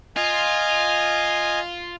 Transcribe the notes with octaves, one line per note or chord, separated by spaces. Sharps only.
F4 D#5 G#5